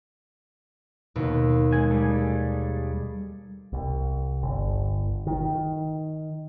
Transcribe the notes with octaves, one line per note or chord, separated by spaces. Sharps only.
D#2 B2
G#3 G#5
G3 G#4 A4
C2
G1
D#3